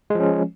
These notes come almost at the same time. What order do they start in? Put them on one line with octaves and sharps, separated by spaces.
G#3 F3 C#4